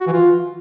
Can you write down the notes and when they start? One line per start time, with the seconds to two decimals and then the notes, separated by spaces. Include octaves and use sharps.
0.01 F#4
0.07 E3
0.13 F4